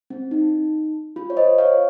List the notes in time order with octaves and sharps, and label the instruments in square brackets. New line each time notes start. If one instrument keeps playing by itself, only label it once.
[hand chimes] C4
D#4
F4
C#5
C5 D#5
C#5 F5